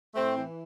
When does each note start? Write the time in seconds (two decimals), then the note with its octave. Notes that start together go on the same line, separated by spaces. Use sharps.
0.15 A2 A3 C4
0.37 E3